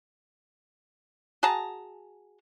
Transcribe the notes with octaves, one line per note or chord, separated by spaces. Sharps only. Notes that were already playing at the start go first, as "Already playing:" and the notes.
F#4 G#4 A5 A#5